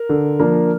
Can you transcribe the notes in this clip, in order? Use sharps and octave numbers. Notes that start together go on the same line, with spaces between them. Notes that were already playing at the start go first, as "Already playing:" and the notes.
Already playing: A#4
D3
F3 A#3 D4